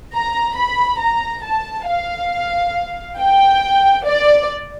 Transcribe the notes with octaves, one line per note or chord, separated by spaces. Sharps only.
A#5
B5
A#5
A5
F5
G5
D5